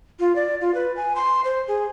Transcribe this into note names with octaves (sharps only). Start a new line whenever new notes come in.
F4
D5
F4
B4
G#5
C6
C5
G#4